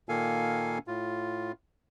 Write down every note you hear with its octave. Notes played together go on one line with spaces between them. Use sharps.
A#2 D#3 A#3 A4 F5 G#5
A2 F4